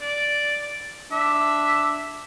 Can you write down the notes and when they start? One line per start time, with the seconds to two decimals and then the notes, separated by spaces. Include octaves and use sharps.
0.01 D5
1.12 D4 E5